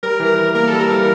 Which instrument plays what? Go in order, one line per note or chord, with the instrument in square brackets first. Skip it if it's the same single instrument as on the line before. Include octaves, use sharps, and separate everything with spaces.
[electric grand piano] G3 [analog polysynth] A#4
[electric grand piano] E3
E3
[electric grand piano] A#3 [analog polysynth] A#4
[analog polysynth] A4
[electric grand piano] G3
[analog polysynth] A#4
[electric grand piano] E3